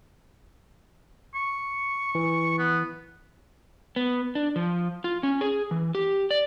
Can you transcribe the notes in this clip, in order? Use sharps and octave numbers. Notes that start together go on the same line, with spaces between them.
C#6
E3
B3
B3
D4
F3
F4
C#4
G#4
E3
G4
D5